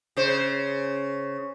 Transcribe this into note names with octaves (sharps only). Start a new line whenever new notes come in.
C#3 C5